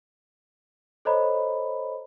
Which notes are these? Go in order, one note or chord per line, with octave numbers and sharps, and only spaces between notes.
A4 C5 C#5 D#5 A#5 B5